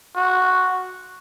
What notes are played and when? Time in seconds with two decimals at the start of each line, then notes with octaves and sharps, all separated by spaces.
0.16 F#4